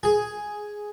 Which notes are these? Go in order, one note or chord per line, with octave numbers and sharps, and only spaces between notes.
G#4